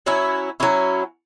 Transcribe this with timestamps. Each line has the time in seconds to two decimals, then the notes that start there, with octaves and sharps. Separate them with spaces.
0.06 F#3 C#4 E4
0.60 F#3 C#4 E4